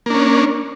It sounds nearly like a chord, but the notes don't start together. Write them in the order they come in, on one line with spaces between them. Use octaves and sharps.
A#3 D4 C#4